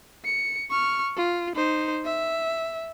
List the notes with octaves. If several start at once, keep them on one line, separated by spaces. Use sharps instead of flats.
C#7
C#6 F6
F4
D#4 C5
E5